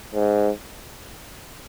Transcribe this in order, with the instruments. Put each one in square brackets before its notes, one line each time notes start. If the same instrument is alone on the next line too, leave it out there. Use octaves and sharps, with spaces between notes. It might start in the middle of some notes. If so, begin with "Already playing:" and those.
[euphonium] G#2